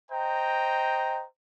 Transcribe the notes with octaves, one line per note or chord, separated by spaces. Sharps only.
C5 D#5 G5 A#5